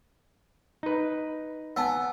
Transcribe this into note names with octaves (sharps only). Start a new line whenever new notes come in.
D#4 B4
B3 G#5 A5 E6